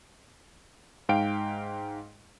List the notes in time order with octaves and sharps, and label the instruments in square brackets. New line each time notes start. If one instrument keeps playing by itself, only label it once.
[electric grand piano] G#2 F5 G5 D7